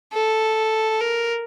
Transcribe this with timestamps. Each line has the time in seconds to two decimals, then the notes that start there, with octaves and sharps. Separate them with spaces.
0.13 A4
1.01 A#4